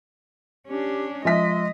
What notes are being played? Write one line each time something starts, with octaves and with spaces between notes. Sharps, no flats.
C#4 D4 G4
F3 G#3 D#5 E5 B6